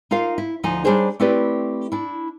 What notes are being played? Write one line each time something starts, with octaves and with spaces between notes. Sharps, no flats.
D#4 F4 A#4 F5
E4
D2 F3 D#4 G#5
G3 D4 D#4 G#4 C5 C#5
A3 C4 E4 G4 B4 D5
D4 E4